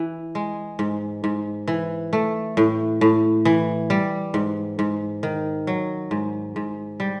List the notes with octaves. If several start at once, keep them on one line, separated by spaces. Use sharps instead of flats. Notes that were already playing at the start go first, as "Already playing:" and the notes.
Already playing: E3
G#3
G#2
G#2
E3
A3
A2
A2
E3
G3
G#2
G#2
D#3
F#3
G#2
G#2
G3